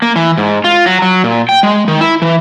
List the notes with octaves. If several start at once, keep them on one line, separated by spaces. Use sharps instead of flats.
A#3
E3
G#2
F4
F#3
F#3
A#2
G5
G#3
D#3
E4
E3